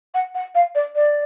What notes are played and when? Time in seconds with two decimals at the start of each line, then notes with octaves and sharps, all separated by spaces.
0.14 F#5
0.34 F#5
0.54 F5
0.75 D5
0.95 D5